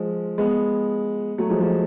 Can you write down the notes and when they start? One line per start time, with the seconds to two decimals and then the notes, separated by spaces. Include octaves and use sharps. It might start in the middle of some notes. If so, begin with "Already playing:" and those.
Already playing: F3 G#3
0.38 G#3 B3
1.38 F#3 A3
1.50 F3 G#3
1.61 F3 G#3